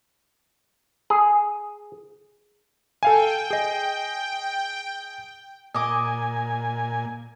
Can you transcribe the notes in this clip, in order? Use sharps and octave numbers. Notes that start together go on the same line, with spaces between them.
G#4
A4 F5 G5 G#5
G#4 D#5
A#2 D#5 G#5 D6